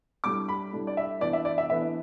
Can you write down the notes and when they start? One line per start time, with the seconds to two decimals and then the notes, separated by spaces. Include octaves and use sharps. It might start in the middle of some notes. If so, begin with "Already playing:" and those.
0.24 A2 G3 D4 D6
0.48 B5
0.72 A2 G3 D4
0.87 D5
0.97 E5
1.21 A2 E3 B3 D4 D5
1.33 E5
1.45 D5
1.58 E5
1.69 A2 E3 B3 D4 E5